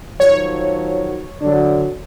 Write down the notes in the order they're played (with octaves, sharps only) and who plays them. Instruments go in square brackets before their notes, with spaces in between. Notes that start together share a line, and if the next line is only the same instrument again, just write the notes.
[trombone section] D#3 F3 F#3 [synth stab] C#5
[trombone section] D3 F#3 D4